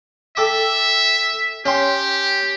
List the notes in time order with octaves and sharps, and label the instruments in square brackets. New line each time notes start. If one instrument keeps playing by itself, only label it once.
[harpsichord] A4 G5 D6 [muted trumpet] E5
[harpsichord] C#4 G5 C6 [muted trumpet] G4